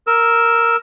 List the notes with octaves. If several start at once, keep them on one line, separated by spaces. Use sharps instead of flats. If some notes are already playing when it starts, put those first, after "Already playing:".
A#4 E6